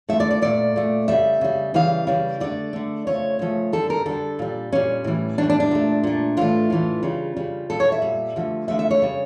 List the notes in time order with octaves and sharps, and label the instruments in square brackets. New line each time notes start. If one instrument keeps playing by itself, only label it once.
[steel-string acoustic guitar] D3 F3 A3 E5
D5
D5
A#2 A3 D5
A#2 A3
C#3 G3 E5
C#3 G3
C#3 E3 G3 F5
C#3 E3 G3
D3 A3 D5
D3 A3
C#3 F3 A3 C#5
C#3 F3 A3
D3 G3 A4
A#4
D3 G3 A4
A#2 G3
A#2 G3 C#4
A2 E3 G3
A2 E3 G3 D4
D4
D4
A#2 A3
A#2 A3
A2 E3 A3 F4
A2 E3 A3
C#3 G3
C#3 G3
A#2 G3 A4
C#5
E5
A#2 G3
D3 F3 A3
D3 F3 A3 E5
E5
C#5
C#3 G3